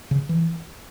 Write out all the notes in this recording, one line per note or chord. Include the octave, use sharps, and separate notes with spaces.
C#3
E3